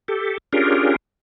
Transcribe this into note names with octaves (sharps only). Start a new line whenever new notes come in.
G4 A4
C#4 D4 F4 G4 G#4 A#4